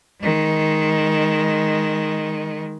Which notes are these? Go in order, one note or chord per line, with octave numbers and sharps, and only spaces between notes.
D#3 G#3